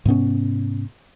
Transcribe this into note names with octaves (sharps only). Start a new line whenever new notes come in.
G#2 C3 B3 C#4